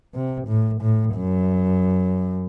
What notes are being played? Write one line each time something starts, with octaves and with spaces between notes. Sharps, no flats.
C3
A2
A2
F#2